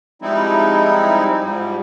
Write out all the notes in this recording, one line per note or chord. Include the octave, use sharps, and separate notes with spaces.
F3 G3 G#3 C4 D#4 E4
G#2 F3 G3